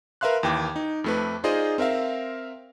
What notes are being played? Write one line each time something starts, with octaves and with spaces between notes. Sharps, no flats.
A#4 B4 E5 F5 C6 F#6
D#2 E3 G5 D6 G#6
D#4
F2 A3 B4
D#4 F4 G#4 C5 D5 D#5
C4 A#4 E5 F5